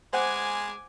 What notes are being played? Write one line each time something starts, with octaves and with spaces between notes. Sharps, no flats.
G#3 C5 F#5 G#5 D6 F#6